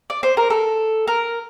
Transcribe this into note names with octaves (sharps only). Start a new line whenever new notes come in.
D5
C5
A#4
A4
A#4